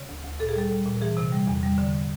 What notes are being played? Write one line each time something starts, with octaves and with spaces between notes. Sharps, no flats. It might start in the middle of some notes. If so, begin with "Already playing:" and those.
Already playing: C#3
D2
D2
A#2 A4
G#4
G3 A4
G3
A#2
E3 G#4
C3
G3
E2
G3
D3